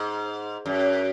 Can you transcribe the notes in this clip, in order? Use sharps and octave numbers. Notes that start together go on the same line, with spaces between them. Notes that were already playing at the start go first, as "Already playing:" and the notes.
Already playing: G#2
F#2